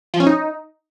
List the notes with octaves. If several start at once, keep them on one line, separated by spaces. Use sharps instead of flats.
F3
C#4
D#4